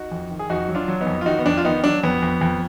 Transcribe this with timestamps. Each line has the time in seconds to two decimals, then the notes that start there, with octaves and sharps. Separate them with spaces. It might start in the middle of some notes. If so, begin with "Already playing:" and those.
Already playing: D#4 F#4
0.11 F2
0.31 D#3
0.39 G#4
0.50 F2 D#4 F#4
0.69 F#3
0.75 D4 F4
0.88 F#3
1.01 B3 D#4
1.07 F2
1.21 F4
1.26 D#3 D#4 F#4
1.39 B3
1.46 F2 D4
1.57 F4
1.65 D#3 B3 D#4
1.84 F#3 D4
2.03 F2 B3
2.22 F2
2.41 F2